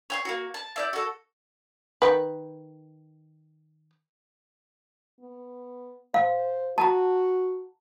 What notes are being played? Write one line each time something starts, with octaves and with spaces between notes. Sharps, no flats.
C#5 G5 C6
A#3 F#4
A5
E4 D5 G6
F#4 A4
D#3 B4
B3
C5 F5
F#4 A5 A#5